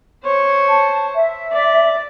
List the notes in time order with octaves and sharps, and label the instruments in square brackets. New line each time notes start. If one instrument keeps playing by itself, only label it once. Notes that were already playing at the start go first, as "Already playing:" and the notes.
[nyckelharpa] C5 C#5
[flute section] A5
E5
[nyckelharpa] D5